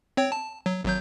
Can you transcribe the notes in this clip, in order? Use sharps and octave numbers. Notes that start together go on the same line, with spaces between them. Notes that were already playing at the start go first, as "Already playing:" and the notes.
C4 C#5 G5
A5
F#3
G#1 F#3 G6